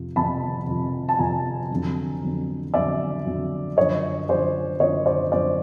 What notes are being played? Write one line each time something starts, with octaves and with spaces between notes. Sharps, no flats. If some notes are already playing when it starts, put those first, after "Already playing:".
Already playing: F2 C3 F3
F2 C3 F3 A5 B5
F2 C3 F3
A5
F2 C3 F3 G#5 A#5
F2 D3 F#3
F2 D3 F#3
F2 D3 F#3 D5 E5
F2 D3 F#3
F#2 D3 F3 C#5 D#5
F#2 D3 F3 C5 D5
F#2 D3 F3 C#5 D#5
C5 D5
F#2 D3 F3 C5 D5